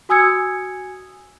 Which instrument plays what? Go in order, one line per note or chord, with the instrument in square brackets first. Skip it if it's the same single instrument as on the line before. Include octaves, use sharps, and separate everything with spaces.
[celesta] F#4 G#5 D#6 E6 G#6 C#7